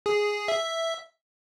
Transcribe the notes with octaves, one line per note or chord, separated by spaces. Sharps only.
G#4
E5